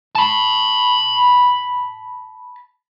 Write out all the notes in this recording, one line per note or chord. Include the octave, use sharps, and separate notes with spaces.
A5 B5